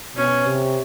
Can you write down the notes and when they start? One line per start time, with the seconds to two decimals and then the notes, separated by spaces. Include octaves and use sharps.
0.16 B2 C#4
0.46 C3